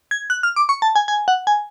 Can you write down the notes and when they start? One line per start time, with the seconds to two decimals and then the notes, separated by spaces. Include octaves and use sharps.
0.11 G#6
0.30 F#6
0.43 F6
0.56 D6
0.69 C#6
0.82 A5
0.96 G#5
1.08 G#5
1.28 F#5
1.47 G#5